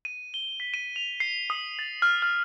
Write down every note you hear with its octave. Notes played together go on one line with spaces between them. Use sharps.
D#7
G7
B6
D#7
F7
C7
D#6
A6
F6
F6